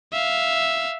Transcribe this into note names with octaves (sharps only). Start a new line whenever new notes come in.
E5 F5